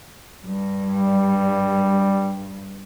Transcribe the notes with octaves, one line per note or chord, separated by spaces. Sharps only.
G2
G3